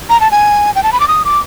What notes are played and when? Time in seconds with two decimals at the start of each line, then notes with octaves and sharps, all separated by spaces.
0.10 A#5
0.21 A5
0.32 G#5
0.76 G5
0.83 A5
0.93 B5
1.00 D6
1.08 D#6
1.25 D6